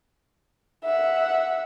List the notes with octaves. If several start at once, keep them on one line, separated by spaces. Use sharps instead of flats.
E5 F#5